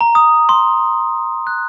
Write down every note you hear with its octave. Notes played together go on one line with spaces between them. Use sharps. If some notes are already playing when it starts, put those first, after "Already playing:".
A#5
D#6
C6
F#6